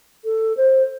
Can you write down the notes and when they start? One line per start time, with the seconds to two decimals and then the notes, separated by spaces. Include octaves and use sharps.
0.25 A4
0.57 C5